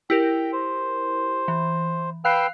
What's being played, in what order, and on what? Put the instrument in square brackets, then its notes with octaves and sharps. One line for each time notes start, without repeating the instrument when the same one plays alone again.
[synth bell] E4 G4 A#4 [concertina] G5
[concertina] C5
[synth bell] E3
[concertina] B4 G5 E6 [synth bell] F5 F#6 C7